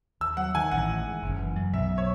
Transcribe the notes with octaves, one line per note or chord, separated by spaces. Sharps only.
D#2 E6
F#3 F#5
D#3 G#5
A1 F#5
D#3
G#2
F#1
E3
F#2
B1 E5
F#3
C#5